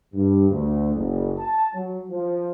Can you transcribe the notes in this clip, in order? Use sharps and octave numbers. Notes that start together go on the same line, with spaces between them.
G2
D2
F#1
A5
F#3
F3